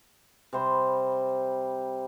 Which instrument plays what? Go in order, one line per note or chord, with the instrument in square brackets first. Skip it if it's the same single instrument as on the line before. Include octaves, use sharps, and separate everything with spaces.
[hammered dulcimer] C3 G3 C5 B5